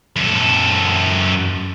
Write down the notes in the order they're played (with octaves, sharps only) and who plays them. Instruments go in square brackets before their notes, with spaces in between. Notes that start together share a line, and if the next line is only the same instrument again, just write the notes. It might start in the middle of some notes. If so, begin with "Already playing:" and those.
[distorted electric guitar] F#2 A4